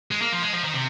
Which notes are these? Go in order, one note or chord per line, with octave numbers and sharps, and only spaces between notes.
G#3
A#3
F3
G#3
F3
D#3
C3